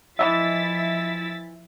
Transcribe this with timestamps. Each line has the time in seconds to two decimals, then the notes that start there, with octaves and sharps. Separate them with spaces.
0.19 E3 F3 E4 D#5 E5 A6 B6